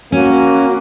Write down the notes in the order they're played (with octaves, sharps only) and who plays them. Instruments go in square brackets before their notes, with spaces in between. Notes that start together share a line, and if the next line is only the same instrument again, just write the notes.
[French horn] A#3 [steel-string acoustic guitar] C#4 [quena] F#4